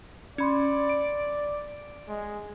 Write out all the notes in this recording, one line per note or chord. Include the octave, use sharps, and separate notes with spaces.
C#4 D5 B5 C6
D7
G#3